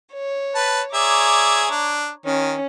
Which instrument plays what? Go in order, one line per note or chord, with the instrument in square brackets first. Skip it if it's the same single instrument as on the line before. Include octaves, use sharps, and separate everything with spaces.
[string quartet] C#5
[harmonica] B4 A5
[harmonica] G#4 D5 E5 [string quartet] C#5 A#5 D6
[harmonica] D4
[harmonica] D#3 [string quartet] C#4